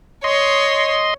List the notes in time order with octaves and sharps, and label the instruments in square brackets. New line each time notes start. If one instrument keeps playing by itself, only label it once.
[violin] C#5 [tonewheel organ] D#5 C6